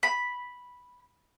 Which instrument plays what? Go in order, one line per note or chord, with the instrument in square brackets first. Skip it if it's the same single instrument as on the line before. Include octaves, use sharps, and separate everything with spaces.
[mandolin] B5